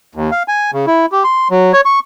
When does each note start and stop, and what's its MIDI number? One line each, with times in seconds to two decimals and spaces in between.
0.15 0.30 39
0.32 0.43 77
0.48 0.71 80
0.73 0.86 49
0.87 1.06 64
1.12 1.23 67
1.24 1.48 84
1.50 1.72 54
1.73 1.81 73
1.85 1.99 85